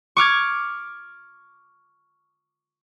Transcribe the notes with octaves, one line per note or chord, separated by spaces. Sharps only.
C#6 D6 F6 G#6